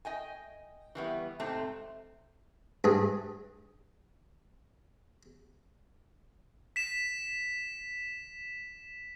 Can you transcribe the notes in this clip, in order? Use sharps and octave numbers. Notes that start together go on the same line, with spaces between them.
D#5 G5 G#5
E3 G3 B3
G#2 C3 A3 C4 A5
G2 G#4
B6 E7